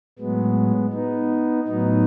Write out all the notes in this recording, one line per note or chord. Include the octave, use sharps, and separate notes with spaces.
A2 F#3 G#3 B3
B3 D#4
A2 F#3 B3 D#4